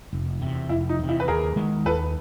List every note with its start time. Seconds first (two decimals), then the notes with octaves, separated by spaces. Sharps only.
0.13 F1
0.41 E2 C3
0.69 F1 E4
0.89 D#4
0.99 E2 C3
1.09 E4
1.20 B4
1.28 D#2 G#4 A#4
1.56 D#3 G#3 B3
1.86 D#2 A4 B4